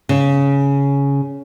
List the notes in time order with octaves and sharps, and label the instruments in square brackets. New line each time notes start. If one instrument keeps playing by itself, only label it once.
[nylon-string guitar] C#3